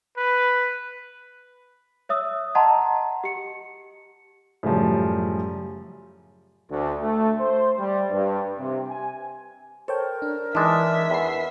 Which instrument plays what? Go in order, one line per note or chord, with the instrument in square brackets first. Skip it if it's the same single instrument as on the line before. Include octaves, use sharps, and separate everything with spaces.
[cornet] B4
[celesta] C#5 E5 D#6 E6
D#5 F#5 A5 A#5 C6
G4 C#7
[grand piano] F#2 A2 C#3 F3 G3
[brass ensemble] D2
A3
C5
G3
G2
C3
G#5
[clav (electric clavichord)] A4 [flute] A#4 [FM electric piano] C5 C#5 G5
[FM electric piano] D4
[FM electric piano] E3 D#4 E6 [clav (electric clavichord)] G#3 D4 [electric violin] E5
[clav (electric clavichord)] E2 [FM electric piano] B5 C7